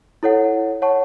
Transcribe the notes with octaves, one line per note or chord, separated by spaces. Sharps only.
E4 A4 C#5 F#5
C#5 F#5 A5 C#6